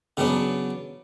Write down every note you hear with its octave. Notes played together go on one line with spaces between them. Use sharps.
C#3 F#3 B3 D4